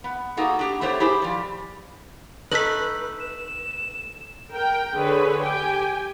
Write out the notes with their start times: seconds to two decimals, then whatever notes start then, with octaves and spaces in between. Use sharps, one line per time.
0.04 B3
0.37 A#3 D#4 F#4 G#4 A4
0.59 D4 G4
0.81 A3 B3 G4 C5 C#5
1.00 E4 G4 G#4 C5
1.22 F3 G3
2.52 A3 D#4 B4 B6 F#7
3.20 E7
4.52 A#4 G5
4.95 D3 G#4 B4 C#5
5.41 G4 G5 G#5